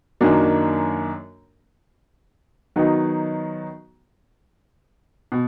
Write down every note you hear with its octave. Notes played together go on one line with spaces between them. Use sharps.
F#2 D#3 F#3 A#3 D4
D#3 F#3 B3 D#4
B2